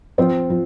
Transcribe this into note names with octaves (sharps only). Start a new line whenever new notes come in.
F3 C4 F4
F3